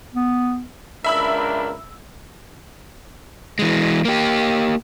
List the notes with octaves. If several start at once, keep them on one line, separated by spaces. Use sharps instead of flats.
B3
C#2 D4 A#4 E5 B5 E6
E3 G#3
A#3 G4